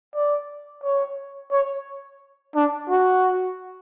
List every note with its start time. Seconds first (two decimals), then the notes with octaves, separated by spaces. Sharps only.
0.15 D5
0.83 C#5
1.51 C#5
2.55 D4
2.90 F#4